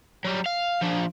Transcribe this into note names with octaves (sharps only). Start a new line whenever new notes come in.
F#3 G3
F5
F3 D4